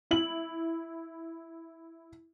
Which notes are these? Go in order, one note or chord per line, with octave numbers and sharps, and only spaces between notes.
E4 F#7